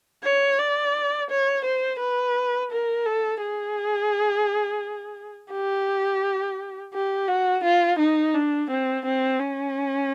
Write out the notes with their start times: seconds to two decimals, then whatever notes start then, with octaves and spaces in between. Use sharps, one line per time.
0.24 C#5
0.59 D5
1.30 C#5
1.65 C5
1.99 B4
2.71 A#4
3.06 A4
3.41 G#4
5.52 G4
6.93 G4
7.28 F#4
7.63 F4
7.99 D#4
8.34 D4
8.70 C4
9.05 C4
9.39 C#4